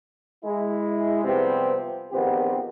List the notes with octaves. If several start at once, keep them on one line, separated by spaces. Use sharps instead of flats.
G#3 E4
C3 F3 G3 B3 C4
A#1 D#3 B3 C4 G4